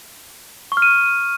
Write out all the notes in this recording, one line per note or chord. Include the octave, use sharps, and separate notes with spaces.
C#6
F6
D#7